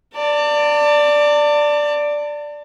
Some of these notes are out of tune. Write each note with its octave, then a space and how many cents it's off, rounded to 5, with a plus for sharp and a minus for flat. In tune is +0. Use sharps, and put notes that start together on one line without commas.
D5 +0 A5 +40